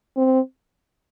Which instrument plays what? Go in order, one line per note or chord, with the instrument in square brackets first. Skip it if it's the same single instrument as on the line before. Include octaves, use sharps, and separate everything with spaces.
[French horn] C4